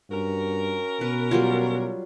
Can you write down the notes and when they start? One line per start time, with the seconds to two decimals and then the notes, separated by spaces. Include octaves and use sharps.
0.10 G2 C#4 F#4 A#4
1.01 B2 B4
1.31 F#3 G3 F4